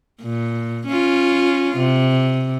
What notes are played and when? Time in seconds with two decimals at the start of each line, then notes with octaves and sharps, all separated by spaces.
0.22 A#2
0.87 C#4 F4
1.77 C3